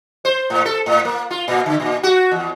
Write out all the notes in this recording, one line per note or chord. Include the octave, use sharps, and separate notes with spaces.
C5
A2
A4
A2
A#3
F4
A#2
D3
A#2
F#4
E2